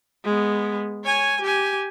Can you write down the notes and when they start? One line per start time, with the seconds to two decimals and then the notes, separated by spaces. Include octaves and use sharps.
0.25 G#3 B3
1.05 C#5 G#5
1.41 G4 G#5